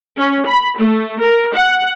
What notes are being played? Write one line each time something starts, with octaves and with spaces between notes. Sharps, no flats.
C#4
B5
A3
A#4
F#5